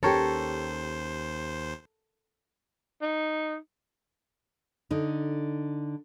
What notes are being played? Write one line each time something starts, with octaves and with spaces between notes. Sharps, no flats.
D#2 C#4 G4 A4 A#4 C5 C#5
D#4
D3 D#4